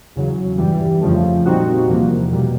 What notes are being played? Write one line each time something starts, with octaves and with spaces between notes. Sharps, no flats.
E2 C#3 F#3
G2 E3 G3
F2 C#3 F3 A3
A#2 G3 C4 D#4 F#4
E2 C3 F3 A#3
B2 G3 A#3